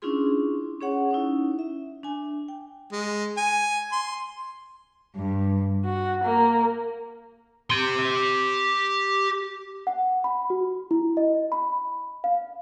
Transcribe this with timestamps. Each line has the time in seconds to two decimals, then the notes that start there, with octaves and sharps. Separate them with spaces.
0.02 C#4 D4 E4 F4 G#4 C6
0.81 C#4 G#4 C#5 F#5
1.11 C#4 D#4 E4
1.59 E5
2.03 D4 G#5
2.48 G5
2.92 G#3
3.37 G#5
3.92 C6
5.16 G2
5.84 F#4
6.23 A#3
7.70 G4 C6
9.87 F#5
10.24 B5
10.50 F#4
10.91 E4
11.17 D#5
11.52 B5
12.24 F5